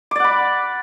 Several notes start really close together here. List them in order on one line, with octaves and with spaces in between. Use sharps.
D6 D5 F#5 B5